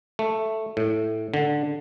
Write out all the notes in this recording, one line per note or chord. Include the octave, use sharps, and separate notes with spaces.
A3
A2
D3